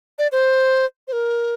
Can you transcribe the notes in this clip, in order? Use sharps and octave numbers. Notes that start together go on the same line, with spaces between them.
D5
C5
C5
A#4